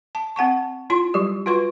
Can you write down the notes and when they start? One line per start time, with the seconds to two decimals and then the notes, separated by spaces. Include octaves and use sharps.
0.15 A5
0.36 C4 F#5 A5 C#6
0.90 E4 F4 C6
1.14 F#3 G3 G4
1.46 F4 F#4 B4 C6 C#6